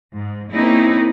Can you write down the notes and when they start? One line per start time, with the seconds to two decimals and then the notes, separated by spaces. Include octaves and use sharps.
0.15 G#2
0.55 A#3 C4 C#4 D#4 E4 G#4